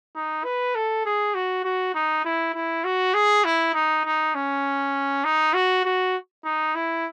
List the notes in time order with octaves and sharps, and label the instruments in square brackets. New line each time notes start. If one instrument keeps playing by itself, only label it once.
[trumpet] D#4
B4
A4
G#4
F#4
F#4
D#4
E4
E4
F#4
G#4
E4
D#4
D#4
C#4
D#4
F#4
F#4
D#4
E4